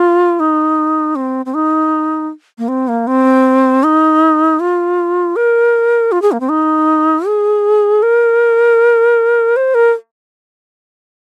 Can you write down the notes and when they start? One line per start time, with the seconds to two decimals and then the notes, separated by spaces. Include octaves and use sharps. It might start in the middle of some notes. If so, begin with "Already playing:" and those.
Already playing: F4
0.40 D#4
1.15 C4
1.46 C4
1.54 D#4
2.58 A#3
2.68 C4
2.88 A#3
3.07 C4
3.83 D#4
4.60 F4
5.36 A#4
6.12 F4
6.22 G#4
6.32 A#3
6.40 C4
6.50 D#4
7.26 G#4
8.02 A#4
9.56 C5
9.74 A#4